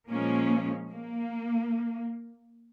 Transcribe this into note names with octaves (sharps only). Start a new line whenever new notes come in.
A#2 F3 G#3 A#3 C#4
A#3